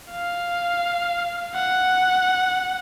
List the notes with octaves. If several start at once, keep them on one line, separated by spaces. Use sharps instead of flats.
F5
F#5